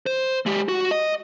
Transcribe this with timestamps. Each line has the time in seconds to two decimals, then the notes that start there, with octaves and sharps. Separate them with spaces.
0.06 C5
0.46 G#3 G4
0.69 F#4
0.91 D#5